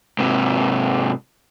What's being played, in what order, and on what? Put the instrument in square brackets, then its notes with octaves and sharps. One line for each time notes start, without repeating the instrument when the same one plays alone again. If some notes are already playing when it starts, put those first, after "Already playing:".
[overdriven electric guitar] G#2 C3